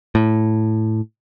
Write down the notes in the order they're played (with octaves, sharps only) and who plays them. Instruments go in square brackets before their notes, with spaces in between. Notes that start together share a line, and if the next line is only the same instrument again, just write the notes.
[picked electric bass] A2